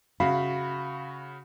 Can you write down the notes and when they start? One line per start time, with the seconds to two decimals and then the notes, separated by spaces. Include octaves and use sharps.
0.20 C#3 F#4 F5 B5